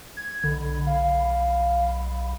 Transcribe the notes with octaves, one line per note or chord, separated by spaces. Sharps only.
G#6
B1 D3
F5